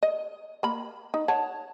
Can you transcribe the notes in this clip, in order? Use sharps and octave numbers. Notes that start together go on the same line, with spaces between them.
D#5
A#3 B5
D#4
C#5 F#5 A5